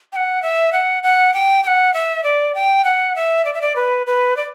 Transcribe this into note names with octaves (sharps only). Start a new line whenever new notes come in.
G5
F#5
E5
F#5
F#5
G5
G5
F#5
E5
D5
G5
F#5
E5
D5
E5
D5
B4
B4
D5